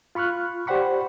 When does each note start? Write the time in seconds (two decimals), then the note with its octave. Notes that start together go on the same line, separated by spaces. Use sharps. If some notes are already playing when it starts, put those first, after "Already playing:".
0.15 F4 B5 C#6 F6 F#6
0.67 G4 C5 D5 F#5 B5 C#6